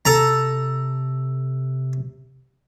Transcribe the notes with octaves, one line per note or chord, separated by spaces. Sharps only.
C3 A4 A#5